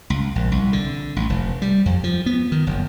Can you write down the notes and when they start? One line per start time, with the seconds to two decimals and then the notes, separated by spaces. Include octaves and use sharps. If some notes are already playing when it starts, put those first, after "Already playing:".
0.10 C#2
0.36 A#1
0.52 C2
0.73 D3
1.16 A1
1.29 F1
1.62 G3
1.86 F2
2.04 F3
2.26 B3
2.52 D#3
2.67 F#1